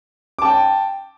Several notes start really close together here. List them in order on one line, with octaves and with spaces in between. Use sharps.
D6 A5 G5